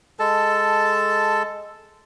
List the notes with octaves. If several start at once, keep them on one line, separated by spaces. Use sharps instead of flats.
G#3 A4 A5